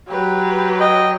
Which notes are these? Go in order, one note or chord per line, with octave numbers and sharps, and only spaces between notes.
F#3 G4 B4
D#5 G5